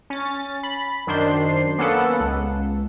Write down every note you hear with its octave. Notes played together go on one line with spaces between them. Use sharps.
C#4 A6
B5
F#2 D#3 D4 C5 C6 C7
A#3 B3 C#4 A4 B4 F#5
C#2